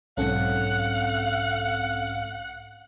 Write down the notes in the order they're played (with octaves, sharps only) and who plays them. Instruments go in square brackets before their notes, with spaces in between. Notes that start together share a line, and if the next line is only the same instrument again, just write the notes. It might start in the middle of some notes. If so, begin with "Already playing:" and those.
[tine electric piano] B1 G#2 [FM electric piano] C4 C#4 A4 [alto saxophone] F5 [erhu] F#5